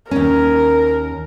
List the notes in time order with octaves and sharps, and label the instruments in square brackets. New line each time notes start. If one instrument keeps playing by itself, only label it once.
[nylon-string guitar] D#2 C#4 [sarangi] A#4